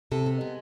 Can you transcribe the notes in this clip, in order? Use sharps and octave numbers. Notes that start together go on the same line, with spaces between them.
C3 A4
B3
G#3